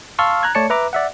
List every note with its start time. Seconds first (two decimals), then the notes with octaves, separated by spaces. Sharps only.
0.19 F5 A5 C6 C#6 E6 F6
0.43 A#5 F#6 G#6
0.55 A3 C#5 D5 A5 C#7
0.70 B4 E5 A#5 D6
0.93 D5 E5 F#5